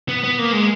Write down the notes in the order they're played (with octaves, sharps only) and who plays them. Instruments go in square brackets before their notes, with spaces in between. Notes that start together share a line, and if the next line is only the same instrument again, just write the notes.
[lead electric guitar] B3
B3
A#3
G#3